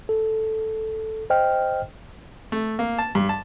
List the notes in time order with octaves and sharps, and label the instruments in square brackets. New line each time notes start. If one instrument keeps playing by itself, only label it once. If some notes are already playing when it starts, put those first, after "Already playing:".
[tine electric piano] A4
C5 D#5 G5 F6
[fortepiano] A3
A#3
A5
G2
A5